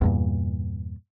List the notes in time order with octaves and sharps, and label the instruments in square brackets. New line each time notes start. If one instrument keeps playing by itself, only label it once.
[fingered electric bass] E2 G2 A#2